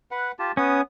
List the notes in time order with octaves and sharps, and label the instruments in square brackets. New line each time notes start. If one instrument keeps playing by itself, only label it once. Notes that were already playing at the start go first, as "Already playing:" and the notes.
[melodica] B4 F#5
F4 G4 A5
[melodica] B3 D#6 [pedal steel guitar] C#4